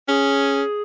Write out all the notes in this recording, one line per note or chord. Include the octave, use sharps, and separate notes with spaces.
C#4 G#4